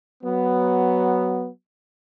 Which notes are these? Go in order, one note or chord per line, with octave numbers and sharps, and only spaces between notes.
F#3 B3